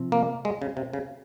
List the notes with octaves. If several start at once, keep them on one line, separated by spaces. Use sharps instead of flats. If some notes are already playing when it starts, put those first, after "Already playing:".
Already playing: C3 F3 C4
A#3
G#3
C#3
C3
C#3